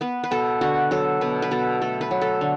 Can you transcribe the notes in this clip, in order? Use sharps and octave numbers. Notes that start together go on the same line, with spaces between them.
B3 B4
B4
B2 A4
D3 F#4
F#3 A4
B2 B4
B4
B2 A4
A3 A4
B4
F#3
A4
D3